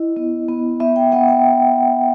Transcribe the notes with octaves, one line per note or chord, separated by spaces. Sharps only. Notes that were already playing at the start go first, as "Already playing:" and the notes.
Already playing: E4 D#5
B3
B3
B3 E5
G5
B3 F#5
G5